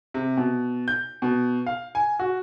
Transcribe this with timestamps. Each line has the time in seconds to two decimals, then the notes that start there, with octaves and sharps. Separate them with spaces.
0.14 C3
0.37 B2
0.88 G6
1.22 B2
1.66 F5
1.95 G#5
2.19 F#4